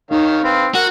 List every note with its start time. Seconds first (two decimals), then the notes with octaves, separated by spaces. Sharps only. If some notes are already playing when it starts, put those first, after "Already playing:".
0.11 D#3 D#4 C#5 F5
0.44 C4 B4 F5
0.75 F#4 A#4 F#5